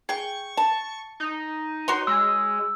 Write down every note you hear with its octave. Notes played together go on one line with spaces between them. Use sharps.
G#4 G5 C#6
A5
D#4
F#4 C#5 C6
G#3 E6